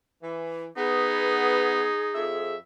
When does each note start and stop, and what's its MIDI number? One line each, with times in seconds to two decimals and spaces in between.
0.23 0.66 52
0.77 1.86 59
0.77 2.28 63
0.77 2.55 68
2.15 2.55 41
2.15 2.55 76